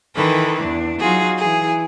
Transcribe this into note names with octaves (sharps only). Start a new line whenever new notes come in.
D#3 E3 A4 B4
E2 D4
F#3 D#4 F4 F#4 G#4
E3 G#4